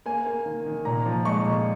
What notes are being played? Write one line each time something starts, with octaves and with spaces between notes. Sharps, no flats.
A#3 G#5
A#3
D#3
D#3
A#2 A#5
F3
G#3 C#6
A#2